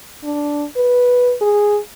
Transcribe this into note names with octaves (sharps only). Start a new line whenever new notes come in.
D4
B4
G#4